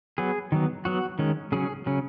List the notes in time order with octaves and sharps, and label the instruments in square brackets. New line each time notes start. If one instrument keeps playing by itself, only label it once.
[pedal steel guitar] F#3 B3 G#4
D#3 F#3 B3
F#3 B3 F#4
D#3 G#3 C#4
C#3 F#3 C#4 G#4
C#3 F#3 C#4